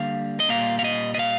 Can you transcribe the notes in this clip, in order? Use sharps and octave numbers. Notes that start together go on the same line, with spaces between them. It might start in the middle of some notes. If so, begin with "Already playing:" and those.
Already playing: D3 G3 A#3 F5
D#5
A#2 G3 A#3 F5
F5
D#5
D#5
F5